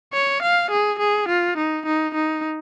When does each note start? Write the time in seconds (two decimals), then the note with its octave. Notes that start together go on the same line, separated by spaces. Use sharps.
0.14 C#5
0.43 F5
0.71 G#4
0.99 G#4
1.29 F4
1.58 D#4
1.86 D#4
2.15 D#4